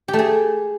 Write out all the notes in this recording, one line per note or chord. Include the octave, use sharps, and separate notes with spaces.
G4
A3
G#4